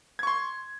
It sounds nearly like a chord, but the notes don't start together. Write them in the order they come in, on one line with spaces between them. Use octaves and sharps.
G#6 C#6 C6